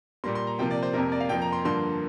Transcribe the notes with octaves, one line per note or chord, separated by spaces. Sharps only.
A#2 G3 A#3 C6
C6
A#5
C3 F3 A#3 G5
D5
C5
F2 C3 A#3 A#4
D5
F5
F2 F3 A#3 G5
A#5
C6
G2 D3 F3 A#3 C6